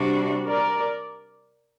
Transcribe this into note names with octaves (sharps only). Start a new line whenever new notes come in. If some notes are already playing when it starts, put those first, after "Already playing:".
Already playing: C3 G3 D4 F#4
A#4 D5